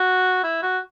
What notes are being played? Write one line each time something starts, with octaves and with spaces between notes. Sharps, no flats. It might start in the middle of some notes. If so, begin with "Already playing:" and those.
Already playing: F#4
E4
F#4